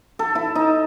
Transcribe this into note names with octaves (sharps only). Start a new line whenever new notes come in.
A4
E4
D#4